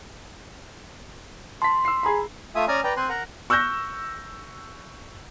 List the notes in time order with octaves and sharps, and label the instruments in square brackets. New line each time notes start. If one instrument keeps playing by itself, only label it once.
[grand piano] A5 B6 [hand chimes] C6
[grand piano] E6 C7
G#4 A#5 B5
[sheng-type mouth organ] A3 F4 E5 G#5 D#6
C#4 D5 G#5 A#5 D#6 F6
B4 D5 G5 A#5
C4 C5 G#5 C6 F#6
A#4 F#5 A#5
[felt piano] C#6 E6 F#6 G6 A#6